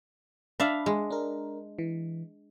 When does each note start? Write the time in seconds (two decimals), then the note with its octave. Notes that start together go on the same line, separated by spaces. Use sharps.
0.60 D4 E5 F5 B5
0.86 G#3
1.10 D4 A#4
1.79 E3